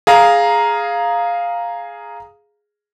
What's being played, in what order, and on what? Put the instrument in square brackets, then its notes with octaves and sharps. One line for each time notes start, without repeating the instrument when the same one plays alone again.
[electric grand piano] G#4 F5 A#5